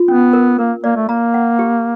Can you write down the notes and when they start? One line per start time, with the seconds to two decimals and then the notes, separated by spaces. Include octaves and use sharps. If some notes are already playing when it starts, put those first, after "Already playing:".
Already playing: F4
0.08 B3 C#4
0.33 A#4
0.59 A#3 A#4
0.83 A#3 D5
0.96 A3
1.09 A#3 A#5
1.34 F#5
1.59 G4